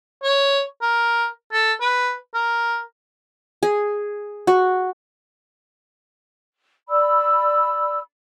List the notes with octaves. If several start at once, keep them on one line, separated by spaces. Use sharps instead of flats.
C#5
A#4
A4
B4
A#4
G#4
F#4
D5 B5 E6